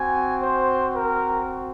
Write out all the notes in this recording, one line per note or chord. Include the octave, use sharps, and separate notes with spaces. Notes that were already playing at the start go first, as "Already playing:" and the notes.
Already playing: C4 F#4 G#5
C5
A#4